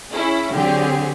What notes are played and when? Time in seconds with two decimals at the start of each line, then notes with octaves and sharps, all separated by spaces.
0.12 C#4 E4 G#4
0.53 D3 F#3 C4 G4 G#4